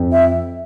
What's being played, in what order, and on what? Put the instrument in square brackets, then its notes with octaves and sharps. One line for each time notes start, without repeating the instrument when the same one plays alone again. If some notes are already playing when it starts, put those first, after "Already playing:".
Already playing: [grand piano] F2
[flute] E5